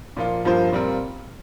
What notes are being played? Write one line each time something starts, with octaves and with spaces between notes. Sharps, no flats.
A#2 F3 A#3 F4
G2 F3 A#3 F4 C5
A#2 G3 C4 F4 A#4